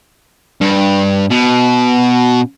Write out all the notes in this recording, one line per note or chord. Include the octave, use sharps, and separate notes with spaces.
G2
B2